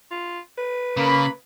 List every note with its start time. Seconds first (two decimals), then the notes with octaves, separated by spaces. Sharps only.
0.11 F4
0.58 B4
0.97 C#3 A#3 B5